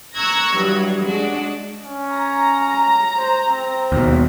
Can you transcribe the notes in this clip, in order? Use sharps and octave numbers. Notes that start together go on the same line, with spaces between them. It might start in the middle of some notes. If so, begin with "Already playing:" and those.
A#5 C#6 E6 F#6 G#6 A#6
G2 E3 F#3
G#3 D4 F#4
C#4
A#5
C5
C4
D#2 B2